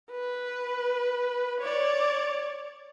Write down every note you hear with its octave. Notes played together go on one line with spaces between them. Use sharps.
B4
C#5 D5